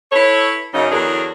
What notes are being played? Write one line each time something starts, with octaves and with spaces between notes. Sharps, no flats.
E4 A4 B4 C#5
F#2 C#3 D#4
E2 D3 F#3 D4 G#4 A#4